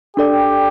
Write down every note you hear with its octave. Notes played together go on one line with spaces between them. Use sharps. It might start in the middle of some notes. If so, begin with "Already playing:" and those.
D4 G4 A4 D5 G5